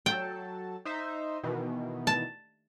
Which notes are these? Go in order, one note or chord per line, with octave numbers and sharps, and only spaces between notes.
F#3 A4 G5 A5
D#4 C5 E5
B2 D#3 E3
A5